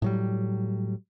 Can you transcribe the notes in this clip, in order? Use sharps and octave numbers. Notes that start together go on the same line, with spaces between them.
A2 F#3 G3